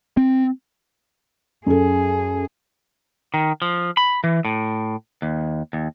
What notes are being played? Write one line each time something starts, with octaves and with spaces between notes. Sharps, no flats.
C4
F#2 G#4 A4
D#3
F3
B5
E3
A2
D#2
D#2